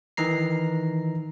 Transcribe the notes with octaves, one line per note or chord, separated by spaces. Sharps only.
D#3 E3 D#4 A#5 C7